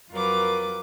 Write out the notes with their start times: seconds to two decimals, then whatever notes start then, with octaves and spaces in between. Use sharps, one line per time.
0.11 F2 F#3 F4 A#4 B4 D6